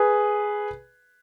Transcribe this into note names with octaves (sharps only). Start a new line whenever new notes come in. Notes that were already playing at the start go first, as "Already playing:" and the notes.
Already playing: G#4 B4